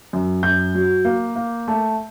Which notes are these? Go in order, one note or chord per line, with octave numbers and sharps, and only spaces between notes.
F#2
F#2 G6
F#3
A#3
A#3
A3